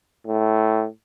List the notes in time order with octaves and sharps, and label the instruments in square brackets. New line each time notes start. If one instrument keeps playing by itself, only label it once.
[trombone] A2